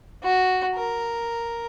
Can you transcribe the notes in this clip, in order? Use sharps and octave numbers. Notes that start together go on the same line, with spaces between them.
F#4
A#4